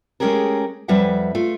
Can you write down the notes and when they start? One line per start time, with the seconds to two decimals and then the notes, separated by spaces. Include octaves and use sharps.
0.20 G#3 A3 C#4 G4 G#4 A#4
0.88 F2 G3 B4 E5 F#5
1.35 A3 F4